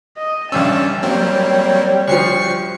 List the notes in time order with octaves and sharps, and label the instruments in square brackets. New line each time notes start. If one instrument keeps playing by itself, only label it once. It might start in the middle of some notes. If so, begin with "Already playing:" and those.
[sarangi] D#5
[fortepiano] A1 G2 E6 [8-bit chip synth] C#4 D4 [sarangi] A5
[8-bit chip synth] F#3 A#3 C4 [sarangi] G3 [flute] C#5
[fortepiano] D2 F3 [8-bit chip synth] C#6 C7 C#7